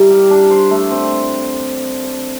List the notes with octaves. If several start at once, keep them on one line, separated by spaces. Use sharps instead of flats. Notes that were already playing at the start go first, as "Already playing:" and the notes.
Already playing: G3 E4 A#4
G4
D4
C5
A3
C4